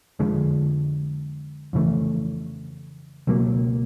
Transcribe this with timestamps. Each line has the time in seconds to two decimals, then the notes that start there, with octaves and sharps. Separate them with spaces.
0.19 F2 D3 F3 G#3
1.73 F2 C#3 E3 A3
3.27 C#2 B2 F#3 A#3